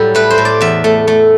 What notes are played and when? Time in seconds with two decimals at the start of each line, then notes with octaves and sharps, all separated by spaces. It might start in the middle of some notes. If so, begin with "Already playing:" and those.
Already playing: A2 F#3 G3 A4
0.15 A3 B4
0.30 C5
0.38 A2
0.45 D5
0.61 E2 E5
0.84 A3
1.07 A3